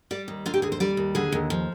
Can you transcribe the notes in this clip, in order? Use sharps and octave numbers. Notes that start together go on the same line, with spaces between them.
G3 D5
D#2
D3 F4
G4
D#2 G#4
C5
G3 D5
D#2
D3 G#4
D#2
F3